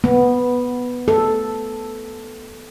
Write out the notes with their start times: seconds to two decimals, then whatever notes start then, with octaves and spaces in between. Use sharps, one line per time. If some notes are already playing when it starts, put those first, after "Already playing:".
0.04 B3
1.08 A4